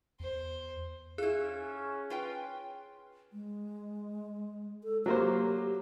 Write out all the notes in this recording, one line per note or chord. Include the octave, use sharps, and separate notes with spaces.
E2 C5
C#4 E4 F4 G#4 F#6
F4 B4 G5
G#3
A4
F#3 A#3 G4 C5